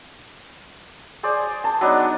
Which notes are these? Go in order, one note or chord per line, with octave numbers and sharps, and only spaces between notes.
G#4 C5 D5
A5 C6
F#3 B3 D4 D#4